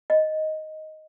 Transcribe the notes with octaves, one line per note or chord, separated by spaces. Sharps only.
D#5